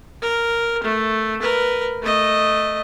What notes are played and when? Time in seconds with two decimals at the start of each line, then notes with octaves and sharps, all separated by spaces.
0.22 A#4
0.84 A3
1.41 A#4 B4
2.03 A3 D#5